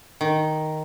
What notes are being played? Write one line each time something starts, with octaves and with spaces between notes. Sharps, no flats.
D#3